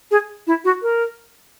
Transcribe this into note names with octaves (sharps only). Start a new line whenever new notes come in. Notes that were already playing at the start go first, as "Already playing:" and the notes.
G#4
E4
F#4
A#4